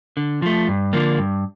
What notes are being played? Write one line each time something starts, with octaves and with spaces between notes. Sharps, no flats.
D3
F3 A3
G2
D3 F3 A#3 D4
G2